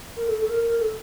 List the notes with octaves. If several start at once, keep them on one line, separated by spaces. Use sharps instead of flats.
A#4
A4
A4
A#4
A#4
A4